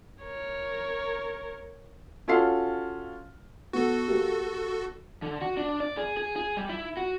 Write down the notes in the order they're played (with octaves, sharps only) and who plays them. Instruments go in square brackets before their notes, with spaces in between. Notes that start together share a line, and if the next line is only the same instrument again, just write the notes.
[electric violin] A#4 C#5
[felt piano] C#4 F4 F#4 A4 F5 C7
[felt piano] B3 [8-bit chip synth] F#4 A4
[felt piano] A#3 G4
[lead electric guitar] D3
F#4
D4
D5
G#4
G#4
G#4
G3
E4
F#4